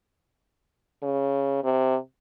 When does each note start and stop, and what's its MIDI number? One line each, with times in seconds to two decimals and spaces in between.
1.02 1.59 49
1.63 1.97 48